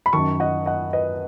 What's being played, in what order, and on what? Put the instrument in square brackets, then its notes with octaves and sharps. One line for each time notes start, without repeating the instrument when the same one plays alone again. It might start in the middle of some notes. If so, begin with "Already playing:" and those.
[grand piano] B5
F#2 D#3 A5 C#6
D#5 F#5
D#5 F#5
B4 D#5